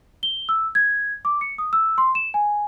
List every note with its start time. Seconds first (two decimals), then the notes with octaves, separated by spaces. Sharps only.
0.23 G7
0.49 E6
0.75 G#6
1.25 D6
1.41 C#7
1.58 D#6
1.73 E6
1.98 C6
2.15 E7
2.34 G#5